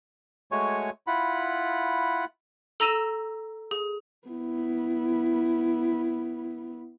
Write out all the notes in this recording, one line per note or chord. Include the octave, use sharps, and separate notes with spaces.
G#3 A3 F#4 C#5 G#5 C#6
E4 F4 F#5 B5
A4 A#5 E6 A#6 D#7 E7
G#4
B3 E4